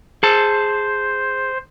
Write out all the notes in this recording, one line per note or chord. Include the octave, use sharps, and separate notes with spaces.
G#4 C5 A5